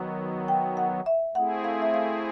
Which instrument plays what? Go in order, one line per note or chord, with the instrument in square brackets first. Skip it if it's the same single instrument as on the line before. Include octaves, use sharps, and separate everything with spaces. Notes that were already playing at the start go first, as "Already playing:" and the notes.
Already playing: [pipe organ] D#3 F#3 B3
[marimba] G5
F#5
E5
[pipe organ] A3 C4 E4 G#4 [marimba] F#5
[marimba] F5
E5
F5